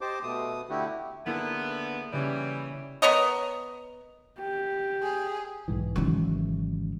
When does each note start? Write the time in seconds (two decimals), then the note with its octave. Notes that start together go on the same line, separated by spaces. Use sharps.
0.01 G4 C5 D#5 A5 D6
0.23 B2 A3 D#6
0.69 D3 A3 E4 F#4 G4
1.26 D3 A#3 B3 E4 G#4
2.12 C#3 E3 G3 C#4
3.02 B3 A#4 C#5 D#5
4.40 G4
5.03 G#4
5.68 B1 G#2 E3
5.96 G#1 C#3 E3 F#3 G#3